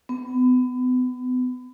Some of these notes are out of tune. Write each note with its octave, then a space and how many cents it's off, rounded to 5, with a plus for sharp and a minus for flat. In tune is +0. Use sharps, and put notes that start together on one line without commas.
B3 +30